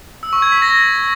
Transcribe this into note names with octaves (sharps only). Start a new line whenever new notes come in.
E6
C#6
G#6
B6
A#6